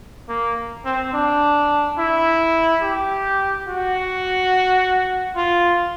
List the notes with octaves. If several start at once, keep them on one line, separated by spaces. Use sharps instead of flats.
A#3
C4
D4
E4
G4
F#4
F4